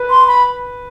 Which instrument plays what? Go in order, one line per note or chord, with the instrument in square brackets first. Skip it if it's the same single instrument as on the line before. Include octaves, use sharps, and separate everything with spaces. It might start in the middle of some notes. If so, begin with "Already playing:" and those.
Already playing: [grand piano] B4
[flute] C6
B5